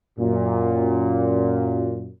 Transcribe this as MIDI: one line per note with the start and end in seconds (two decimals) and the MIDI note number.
0.18 2.09 42
0.18 2.09 46